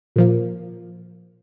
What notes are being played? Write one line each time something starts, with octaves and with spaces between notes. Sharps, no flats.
A#2 F3 A#3